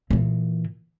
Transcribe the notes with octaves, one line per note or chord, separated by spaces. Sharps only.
A#2 E3